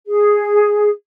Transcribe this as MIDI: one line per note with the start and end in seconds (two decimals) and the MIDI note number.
0.07 0.89 68